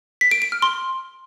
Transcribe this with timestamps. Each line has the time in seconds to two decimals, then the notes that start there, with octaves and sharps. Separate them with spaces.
0.21 B6
0.31 D7
0.42 D7
0.52 F6
0.62 C6